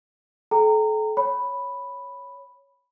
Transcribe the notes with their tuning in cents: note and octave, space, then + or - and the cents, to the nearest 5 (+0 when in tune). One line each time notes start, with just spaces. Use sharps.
A4 -35 G5 +0 A#5 -25
C#5 +0 B5 +0